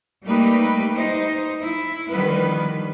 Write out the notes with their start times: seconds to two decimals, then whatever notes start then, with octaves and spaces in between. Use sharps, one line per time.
0.24 G3 A3 A#3 D#4 G4 B4
0.95 D#4 C5
1.62 E4
2.09 D3 D#3 F3 G3 B3 B4